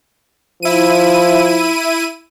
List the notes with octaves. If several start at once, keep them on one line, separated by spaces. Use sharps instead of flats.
F3 E4 D#7